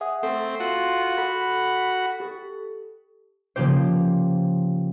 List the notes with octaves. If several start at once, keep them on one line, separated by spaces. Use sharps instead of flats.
G#4 E5 F#5 D#6
A3 C4 A4
F4 F#4
A4 F#5 B5
G4 A4
C#3 F3 A#3 G4 C5